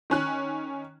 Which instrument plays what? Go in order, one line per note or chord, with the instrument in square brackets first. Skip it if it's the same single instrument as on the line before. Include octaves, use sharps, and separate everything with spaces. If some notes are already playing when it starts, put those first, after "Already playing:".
[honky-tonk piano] D#3 C#4 F#6